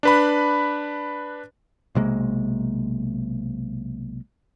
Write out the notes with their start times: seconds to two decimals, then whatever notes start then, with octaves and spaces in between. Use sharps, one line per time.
0.03 D4 B4 B5
1.95 B1 C3 G#3 A#3